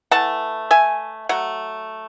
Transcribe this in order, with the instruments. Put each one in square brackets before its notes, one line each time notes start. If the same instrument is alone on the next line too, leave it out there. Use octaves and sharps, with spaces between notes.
[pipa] E3 A3 F#5 A5
E5 G#5
F#3 A3 F#5